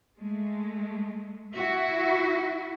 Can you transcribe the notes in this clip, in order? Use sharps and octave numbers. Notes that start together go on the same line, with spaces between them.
G#3 A3
E4 F#4 E5